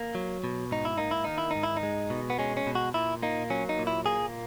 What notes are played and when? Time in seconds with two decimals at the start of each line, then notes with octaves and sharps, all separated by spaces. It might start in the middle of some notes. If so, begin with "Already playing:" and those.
Already playing: A#3
0.15 F#3
0.44 B2
0.71 G#2 D#4
0.85 E4
0.98 A#3 D#4
1.11 E4
1.24 D#3 D#4
1.38 E4
1.51 G#2 D#4
1.63 E4
1.77 D#4
1.83 G#3
2.10 B2
2.30 B3
2.39 G#3 C#4
2.57 C#4
2.67 B2
2.75 F#4
2.94 A#2 E4
3.23 A#3 D#4
3.50 F#3 C#4
3.69 D#4
3.79 A#2
3.87 E4
4.06 A#3 G#4